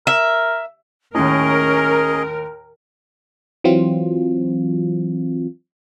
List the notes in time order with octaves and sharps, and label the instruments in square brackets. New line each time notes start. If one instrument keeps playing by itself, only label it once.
[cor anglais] A#4 [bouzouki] E5
[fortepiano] D#2 A2 [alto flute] C#4 [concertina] G#4 D#5 [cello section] A#4
[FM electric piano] E3 F#3 C4 F4